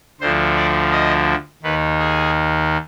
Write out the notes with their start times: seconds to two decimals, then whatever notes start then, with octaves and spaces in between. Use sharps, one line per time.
0.21 D2 D3 F3 C5
0.56 D5
0.92 D#5
1.63 D#2 D#3 B4
1.99 G#4